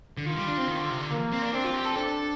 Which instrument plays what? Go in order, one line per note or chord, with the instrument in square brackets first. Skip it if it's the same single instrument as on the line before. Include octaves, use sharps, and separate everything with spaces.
[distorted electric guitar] D3
[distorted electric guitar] D#3 [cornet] F4
[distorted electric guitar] G3
D4
C4
D#3
D3
C3
D3
[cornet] A#3
[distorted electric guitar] C4
D4
[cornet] C4 [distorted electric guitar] D4
[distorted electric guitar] F4
G4
A4
[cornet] D4 [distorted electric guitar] A4